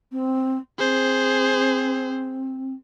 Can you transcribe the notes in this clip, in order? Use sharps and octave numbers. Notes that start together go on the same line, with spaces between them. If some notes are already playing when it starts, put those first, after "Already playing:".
C4
C4 G#4 C5